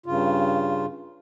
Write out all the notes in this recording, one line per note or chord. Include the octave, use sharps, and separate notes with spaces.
G2 C#3 F4